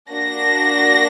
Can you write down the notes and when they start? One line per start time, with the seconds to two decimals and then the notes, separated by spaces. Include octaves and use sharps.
0.11 A#3 D4 F#4 A#6